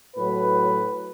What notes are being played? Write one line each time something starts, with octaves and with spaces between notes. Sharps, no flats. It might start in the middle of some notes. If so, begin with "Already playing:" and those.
A2 F#3 B4